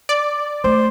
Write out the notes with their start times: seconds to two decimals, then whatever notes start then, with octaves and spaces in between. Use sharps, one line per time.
0.09 D5
0.64 A3 C5